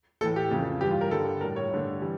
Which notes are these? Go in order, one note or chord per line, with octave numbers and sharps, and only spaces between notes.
A2 E3 A3 A4
G4
F2 C#3 E3 A3
G2 E3 G3 G4
F4
A#4
G2 D3 G3 A4
A2 G3 A#4
C#5
G2 D3 A3
E3 G3